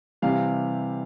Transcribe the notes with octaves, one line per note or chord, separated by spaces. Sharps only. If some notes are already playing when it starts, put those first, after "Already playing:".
C3 E3 G3 F5